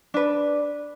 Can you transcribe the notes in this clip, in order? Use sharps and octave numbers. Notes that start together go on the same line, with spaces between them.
D4 B4